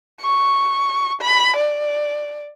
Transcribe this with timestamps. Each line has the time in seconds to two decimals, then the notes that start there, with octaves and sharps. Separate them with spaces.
0.21 C#6
1.21 B5
1.57 D5